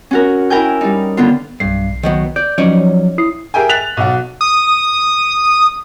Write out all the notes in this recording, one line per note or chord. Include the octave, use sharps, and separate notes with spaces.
C#4 F#4 A#4
E4 A#4 G5 G#5 G6
G3 D#4
D3 B3 F4
B1 G2 C7
D#3 F#3 B3
D5 G6
F3 F#3 C#4 D#4 D5
E4 D#6 C7
G4 G#4 A#4 E5 G5 G#5
F#6 A6 B6 F7 F#7
B1 F#4
D#6